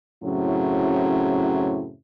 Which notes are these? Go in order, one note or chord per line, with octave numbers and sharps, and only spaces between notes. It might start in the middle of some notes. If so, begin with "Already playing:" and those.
F#2 A2 C#3 F#3 C4 E4